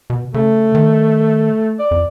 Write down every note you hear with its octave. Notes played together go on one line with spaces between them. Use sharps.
B2
C#3 A3
D#3
D5
F2